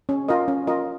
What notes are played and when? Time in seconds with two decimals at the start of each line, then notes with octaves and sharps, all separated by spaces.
0.09 C#4
0.28 F4 A#4 D#5
0.48 C#4
0.67 F4 A#4 D#5